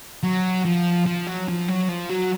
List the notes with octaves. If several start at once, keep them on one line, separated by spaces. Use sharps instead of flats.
F#3
F3
F3
F#3
F3
F#3
F3
F#3